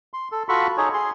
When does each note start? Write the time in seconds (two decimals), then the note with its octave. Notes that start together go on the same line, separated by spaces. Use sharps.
0.14 C6
0.32 A4
0.49 F4 F#4 A4 B5 C#6
0.77 D#4 G#4 C#5
0.94 G#4 C6